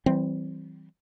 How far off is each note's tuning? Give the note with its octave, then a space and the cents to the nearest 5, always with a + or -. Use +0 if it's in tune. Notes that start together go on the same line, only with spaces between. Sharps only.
E3 -10 G3 -35 C4 +0